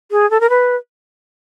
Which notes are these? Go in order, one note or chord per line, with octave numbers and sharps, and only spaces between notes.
G#4
A4
A#4
B4